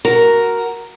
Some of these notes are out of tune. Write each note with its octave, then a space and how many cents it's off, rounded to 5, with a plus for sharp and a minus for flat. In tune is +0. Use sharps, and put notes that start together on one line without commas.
F#4 +0 A#4 +0